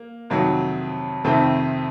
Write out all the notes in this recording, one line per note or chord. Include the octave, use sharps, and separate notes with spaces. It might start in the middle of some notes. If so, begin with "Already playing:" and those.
Already playing: A#3
F2 C3 D#3 F#3
F2 C3 D#3 A3 C4